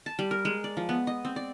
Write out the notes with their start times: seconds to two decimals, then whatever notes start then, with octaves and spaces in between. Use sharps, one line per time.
0.06 A5
0.19 G3
0.31 A#4
0.45 G#3
0.64 D5
0.77 F3
0.89 B3
1.07 D#5
1.25 C4
1.36 D5